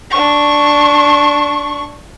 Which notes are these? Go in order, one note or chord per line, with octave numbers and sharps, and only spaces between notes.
D4 C#6